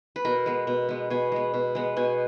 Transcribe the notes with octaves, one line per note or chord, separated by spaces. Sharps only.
B4
B2 A#4
G#3 B3
B2
G#3 B3
B2 G#5
G#3 B3
B2
G#3 B3
B2 G#5